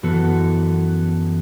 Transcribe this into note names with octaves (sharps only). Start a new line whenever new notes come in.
F#2 E3 B3 F#4 A4